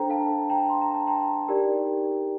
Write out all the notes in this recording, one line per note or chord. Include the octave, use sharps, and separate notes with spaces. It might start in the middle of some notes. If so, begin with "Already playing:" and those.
Already playing: D4 A4 C5 G5 A#5
F5 A5
G5 A#5
C6
A#5
A5
G5 A#5
D#4 G4 A#4 D5